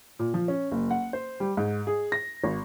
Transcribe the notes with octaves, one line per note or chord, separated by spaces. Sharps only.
A#2
F3
C#4
F#1
F#5
C5
G3
G#2
G#4
A#6
G#1